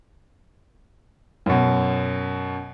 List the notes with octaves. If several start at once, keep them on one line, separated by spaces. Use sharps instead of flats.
F#2 B2